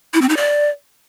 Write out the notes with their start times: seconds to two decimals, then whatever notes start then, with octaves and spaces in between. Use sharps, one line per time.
0.14 E4
0.21 C4
0.29 D#4
0.37 D5